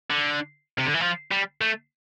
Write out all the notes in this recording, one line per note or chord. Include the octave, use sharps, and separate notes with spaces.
D3
C3
D3
E3
F3
G3
A3